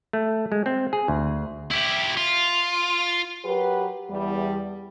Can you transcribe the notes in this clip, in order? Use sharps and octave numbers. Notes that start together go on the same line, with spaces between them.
A3
G#3
C4
G#4
D2
E4 G4
F4
F#3 G4 A#4 B4
E2 G3